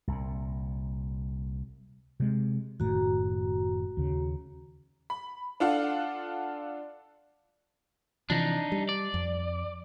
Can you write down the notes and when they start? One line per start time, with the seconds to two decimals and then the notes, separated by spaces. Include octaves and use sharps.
0.08 C2 A#2
2.20 C3 G#3
2.80 F#1 A2 D#3 F#4 A#5
3.97 D#2 C#3
5.10 B5
5.60 D4 F4 A4 F5 F#5
8.30 C3 E3 F3 D4 D#4
8.72 G3
8.89 D5
9.14 F2